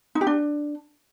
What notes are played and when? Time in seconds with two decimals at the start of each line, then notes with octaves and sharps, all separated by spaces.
0.15 D#4
0.21 G4
0.27 D4